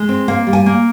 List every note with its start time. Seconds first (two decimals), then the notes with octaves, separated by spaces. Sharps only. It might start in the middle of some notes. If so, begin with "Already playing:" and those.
Already playing: G#3
0.09 C4
0.28 A#3 F5
0.47 G3
0.53 G#5
0.66 A#3